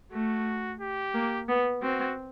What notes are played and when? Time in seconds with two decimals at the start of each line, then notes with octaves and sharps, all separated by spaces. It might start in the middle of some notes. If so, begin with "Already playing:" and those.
0.12 A3 F#4
0.80 G4
1.14 A#3
1.48 B3
1.82 C4 F#4